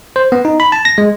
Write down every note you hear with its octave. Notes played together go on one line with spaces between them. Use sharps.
C5
B3
D#4
B5
A5
A#6
G#3